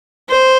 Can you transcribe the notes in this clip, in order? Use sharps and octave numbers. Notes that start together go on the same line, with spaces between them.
C5